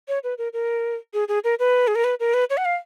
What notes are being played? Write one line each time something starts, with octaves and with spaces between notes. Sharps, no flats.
C#5
B4
A#4
A#4
G#4
G#4
A#4
B4
G#4
A#4
B4
A#4
B4
C#5
F#5
F5